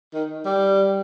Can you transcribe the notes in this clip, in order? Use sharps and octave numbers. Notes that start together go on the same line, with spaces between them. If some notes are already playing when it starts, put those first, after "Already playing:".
D#3
G3